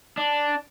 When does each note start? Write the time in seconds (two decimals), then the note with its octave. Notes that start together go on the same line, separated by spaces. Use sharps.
0.17 D4